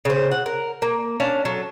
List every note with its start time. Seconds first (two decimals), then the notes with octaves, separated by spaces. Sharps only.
0.05 C#3 C5
0.31 F#5
0.46 A#4
0.82 A#3
1.20 C#4 D4 F5
1.45 F#3 A4